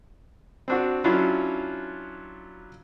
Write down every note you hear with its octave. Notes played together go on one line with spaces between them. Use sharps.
C4 D4 F#4
F#3 C#4 D4 E4 F4